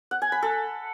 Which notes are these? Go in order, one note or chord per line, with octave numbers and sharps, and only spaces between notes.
F#5
G#5
B5
A4